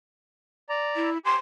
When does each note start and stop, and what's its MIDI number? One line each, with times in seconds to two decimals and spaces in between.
0.69 1.10 74
0.69 1.10 82
0.96 1.18 64
1.25 1.37 67
1.25 1.37 80
1.25 1.36 84